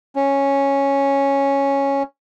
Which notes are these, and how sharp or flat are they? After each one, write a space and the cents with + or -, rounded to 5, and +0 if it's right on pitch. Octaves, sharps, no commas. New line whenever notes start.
C#4 -5